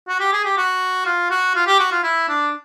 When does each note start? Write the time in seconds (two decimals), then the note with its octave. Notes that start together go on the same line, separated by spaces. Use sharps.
0.08 F#4
0.20 G4
0.33 G#4
0.45 G4
0.57 F#4
1.06 F4
1.30 F#4
1.55 F4
1.67 G4
1.79 F#4
1.92 F4
2.03 E4
2.29 D4